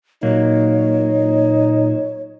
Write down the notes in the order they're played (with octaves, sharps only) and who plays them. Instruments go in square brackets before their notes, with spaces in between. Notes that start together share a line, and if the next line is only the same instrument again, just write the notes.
[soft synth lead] A#2 [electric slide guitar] F#3 A#3 [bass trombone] D#4 [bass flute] C#5